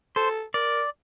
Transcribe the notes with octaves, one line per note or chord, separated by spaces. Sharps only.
A4 C5
A#4 D5